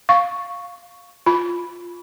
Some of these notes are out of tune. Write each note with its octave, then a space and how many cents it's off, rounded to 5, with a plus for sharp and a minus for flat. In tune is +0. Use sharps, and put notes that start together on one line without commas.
F5 +5 C#6 +0
F4 +0 B5 +0